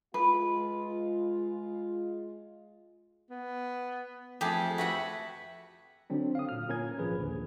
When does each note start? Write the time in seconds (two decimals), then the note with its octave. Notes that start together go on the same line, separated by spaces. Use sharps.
0.14 G#3 F4 B4
3.30 B3
4.41 F2 A3 G4 G#4
4.78 F#4 B4 E5 F#5
6.10 D3 F#3 C4 D4
6.35 F5 D#6
6.49 A#2 F6
6.69 A#2 C#4 A#4 G#5 G#6
6.99 G#1 F3 G#4 B4
7.18 A#1 D#2 D3